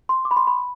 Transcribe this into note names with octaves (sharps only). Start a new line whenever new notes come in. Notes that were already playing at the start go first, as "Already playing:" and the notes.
C6
D6
B5
C6
B5